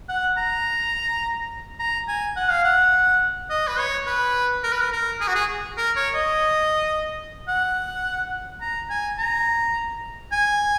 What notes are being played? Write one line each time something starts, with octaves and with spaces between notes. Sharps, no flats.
F#5
A#5
A#5
G#5
F#5
F5
F#5
D#5
B4
C#5
B4
A#4
B4
A#4
A#4
G#4
F#4
G#4
A#4
C#5
D#5
F#5
A#5
G#5
A#5
G#5